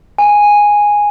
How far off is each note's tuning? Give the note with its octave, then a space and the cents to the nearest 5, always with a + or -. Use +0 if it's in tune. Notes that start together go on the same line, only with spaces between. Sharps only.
G#5 -5